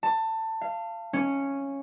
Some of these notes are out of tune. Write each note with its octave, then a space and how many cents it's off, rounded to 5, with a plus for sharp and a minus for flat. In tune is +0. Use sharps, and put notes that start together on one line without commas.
A5 +20
F5 -25
C#4 -5